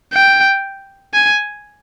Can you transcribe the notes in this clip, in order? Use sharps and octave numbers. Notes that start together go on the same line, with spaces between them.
G5
G#5